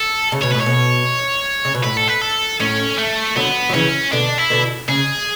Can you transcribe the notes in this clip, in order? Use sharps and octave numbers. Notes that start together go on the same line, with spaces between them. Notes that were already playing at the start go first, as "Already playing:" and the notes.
Already playing: A4
C#3
B2 C#5
A2 B4
C#5
B2
C#3
B2
A2 B4
A4
B4
A4
A2 C#4
A3
D3 F#3 B3
F#3
C#3 E3 C#4
B2 D3 D4
E4
B2 D3
C#3 G#4